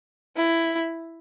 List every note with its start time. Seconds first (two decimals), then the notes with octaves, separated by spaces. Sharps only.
0.36 E4